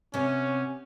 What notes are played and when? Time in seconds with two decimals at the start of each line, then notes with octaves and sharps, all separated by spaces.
0.14 C3 B3 C#4